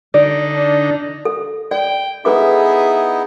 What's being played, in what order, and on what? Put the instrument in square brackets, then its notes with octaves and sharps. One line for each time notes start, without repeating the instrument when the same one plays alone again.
[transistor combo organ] D3 D#4 [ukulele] D5
[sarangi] D4
[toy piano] A4
[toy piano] D5 [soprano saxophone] G5
[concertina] B3 D#4 E4 [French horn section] G#4 [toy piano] A4 B4 D6 [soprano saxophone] E5